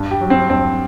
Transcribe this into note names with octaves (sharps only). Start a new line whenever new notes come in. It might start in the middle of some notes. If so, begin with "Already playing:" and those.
Already playing: G2
G4
F#3
C4
G2 C4